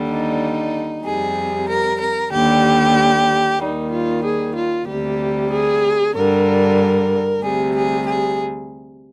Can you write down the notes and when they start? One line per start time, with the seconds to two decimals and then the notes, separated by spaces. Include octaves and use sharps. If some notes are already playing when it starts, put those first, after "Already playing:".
Already playing: D#2 D3 G3
0.09 D#4
1.04 F2 C3 G3 G#4
1.68 A#4
2.00 A#4
2.32 D#2 D3 G3 G4
3.59 D#2 D#3 G3 D#4
3.91 F4
4.24 G#4
4.55 F4
4.87 D2 C3 G3 G4
5.51 G#4
6.15 G2 D3 G3 A#4
7.42 D2 C3 G3 G#4
7.74 G#4
8.06 G#4